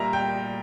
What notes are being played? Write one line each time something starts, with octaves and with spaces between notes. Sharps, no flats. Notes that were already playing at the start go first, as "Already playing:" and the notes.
Already playing: A#2 G3 A#3 E5 A#5
G5